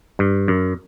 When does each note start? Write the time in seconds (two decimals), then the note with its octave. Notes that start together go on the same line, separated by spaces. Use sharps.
0.19 G2
0.48 F#2